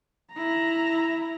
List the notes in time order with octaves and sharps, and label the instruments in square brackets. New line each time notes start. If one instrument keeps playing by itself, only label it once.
[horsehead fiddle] E4 A#5